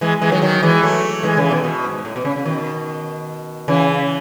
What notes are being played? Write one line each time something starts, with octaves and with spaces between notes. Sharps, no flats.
E3 G#3
E3 G#3
D#3 F#3
D#3 F#3
E3 G#3
F#3 A3
E3 G#3
C#3 E3
B2 D#3
B2
G#2
A2
B2
C#3
C#3
B2 D#3
C#3 E3